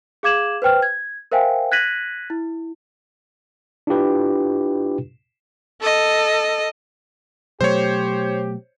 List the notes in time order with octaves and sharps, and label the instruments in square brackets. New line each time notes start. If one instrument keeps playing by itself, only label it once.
[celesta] G#4 F5 D6 G#6 E7 F#7
B4 C5 G5 F6
G#6
A#4 C5 E5 F5 G5 G#5
F#6 G#6 A#6 B6 D#7 F#7
E4
[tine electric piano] D4 E4 F4 G4 B4
[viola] A4 D#5
[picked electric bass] B2 F#3 A3 [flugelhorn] G4 [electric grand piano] C5 C#5